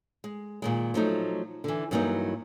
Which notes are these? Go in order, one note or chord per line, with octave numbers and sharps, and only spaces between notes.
G#3
A#2 D#3 G#3
F3 F#3 A3 D#4
D3 E3
G2 E3 F#3 A#3 D4 D#4